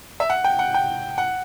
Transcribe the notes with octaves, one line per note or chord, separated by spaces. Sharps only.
E5
F#5
G5
F#5
G5
F#5